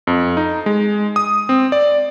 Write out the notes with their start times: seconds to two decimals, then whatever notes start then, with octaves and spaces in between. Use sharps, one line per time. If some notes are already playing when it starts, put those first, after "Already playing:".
0.07 F2
0.37 D#4
0.66 G#3
1.16 D#6
1.49 C4
1.72 D5